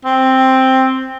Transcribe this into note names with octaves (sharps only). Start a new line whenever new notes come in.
C4